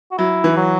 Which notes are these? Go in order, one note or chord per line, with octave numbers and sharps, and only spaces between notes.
F#4
F#3 E4
E3
F#3